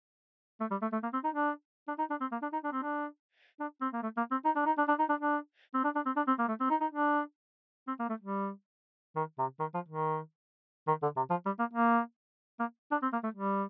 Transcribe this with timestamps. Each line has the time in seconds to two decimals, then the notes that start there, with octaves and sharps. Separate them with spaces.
0.60 A3
0.71 G3
0.82 A3
0.92 A3
1.03 A#3
1.13 C4
1.24 D#4
1.34 D4
1.88 D4
1.98 D#4
2.10 D4
2.20 C4
2.31 A#3
2.42 D4
2.52 D#4
2.63 D4
2.72 C4
2.82 D4
3.60 D4
3.81 C4
3.93 A#3
4.02 A3
4.17 A#3
4.31 C4
4.45 D#4
4.55 D4
4.66 D#4
4.77 D4
4.88 D4
4.99 D#4
5.09 D4
5.20 D4
5.74 C4
5.84 D4
5.95 D4
6.06 C4
6.16 D4
6.27 C4
6.39 A#3
6.48 A3
6.60 C4
6.70 D#4
6.81 D#4
6.91 D4
7.87 C4
7.99 A#3
8.09 A3
8.20 G3
9.16 D#3
9.38 C3
9.60 D#3
9.74 F3
9.88 D#3
10.87 D#3
11.02 D3
11.16 C3
11.30 F3
11.45 G3
11.59 A#3
11.73 A#3
12.60 A#3
12.91 D4
13.02 C4
13.12 A#3
13.23 A3
13.34 G3